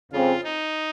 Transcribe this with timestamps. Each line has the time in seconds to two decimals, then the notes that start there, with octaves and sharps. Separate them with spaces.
0.12 F2 C#3 G#3 C4 F4
0.44 D#4